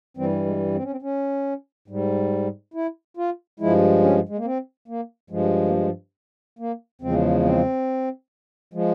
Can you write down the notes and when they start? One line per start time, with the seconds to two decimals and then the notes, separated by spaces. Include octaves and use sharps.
0.17 G2 E3 G3 C4
0.46 G#3
0.74 C4
0.83 C#4
0.91 C4
1.02 C#4
1.88 G#2 G3
2.74 E4
3.17 F4
3.60 G2 F3 G#3 E4
4.02 C#4
4.29 G#3
4.37 A#3
4.45 C4
4.88 A#3
5.30 G2 F3 G#3
5.68 A#3
5.74 G#3
6.59 A#3
7.01 E2 C#3 F3 G#3 C4
7.45 C4
8.74 F3 G#3